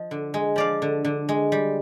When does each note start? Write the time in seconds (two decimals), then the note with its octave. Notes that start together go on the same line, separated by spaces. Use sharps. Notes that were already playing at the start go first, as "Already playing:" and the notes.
Already playing: F3 D#5
0.11 D3
0.34 G#3
0.56 F3 D5 F5
0.82 D3
1.05 D3
1.29 G#3
1.52 G3